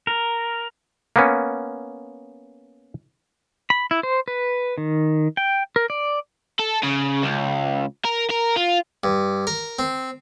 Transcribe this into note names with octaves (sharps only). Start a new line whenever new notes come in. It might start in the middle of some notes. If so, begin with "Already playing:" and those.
A#4
A#3 B3 C#4
B5
E4
C5
B4
D#3
G5
A#4
D5
A4
C#3
C#2
A#4
A#4
F4
G2
A#4
C4